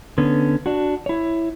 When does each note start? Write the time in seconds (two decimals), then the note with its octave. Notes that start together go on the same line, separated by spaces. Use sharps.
0.18 D3 B3 C#4
0.66 D4 F#4
1.06 E4 C#5